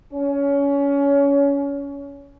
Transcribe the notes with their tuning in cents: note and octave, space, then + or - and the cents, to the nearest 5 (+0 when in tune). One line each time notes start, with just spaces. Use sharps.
C#4 +25